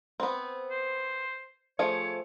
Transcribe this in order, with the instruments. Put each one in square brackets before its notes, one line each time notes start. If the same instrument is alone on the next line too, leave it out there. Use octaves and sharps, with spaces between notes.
[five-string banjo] B3 C4
[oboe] C5
[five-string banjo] F3 A3 G#4 [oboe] C#5